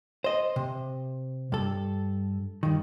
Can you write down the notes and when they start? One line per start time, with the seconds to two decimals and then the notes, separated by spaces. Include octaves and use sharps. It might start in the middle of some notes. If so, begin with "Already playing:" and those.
0.24 C5 D#5
0.56 C3
1.52 G2 A4
2.63 G2 D#3